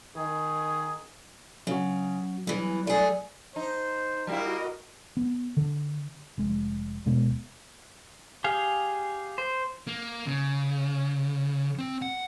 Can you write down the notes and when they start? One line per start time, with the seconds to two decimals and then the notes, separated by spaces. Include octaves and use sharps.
0.16 D#3 G#4
1.67 C#3 F#3 C#4 F#4
2.47 E2 E3 F#3 G3
2.87 A3 G#4 D5
3.56 D#4 C5
4.27 G3 A#3 E4 F#4 A#4 D#5
5.17 B3
5.57 D3
6.37 F1 G#3
7.05 D1 B2 G#3 B3
8.44 G4 G#4 F5
9.38 C5
9.87 A#3
10.26 C#3
11.78 C4
12.02 F#5